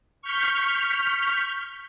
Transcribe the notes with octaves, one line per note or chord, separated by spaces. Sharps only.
C#6 F6 G6 B6